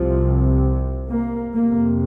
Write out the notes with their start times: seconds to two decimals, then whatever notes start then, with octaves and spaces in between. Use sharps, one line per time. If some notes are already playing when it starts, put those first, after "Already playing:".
Already playing: C2 C3 F3
1.09 A#3
1.54 F2 A#3
1.60 C3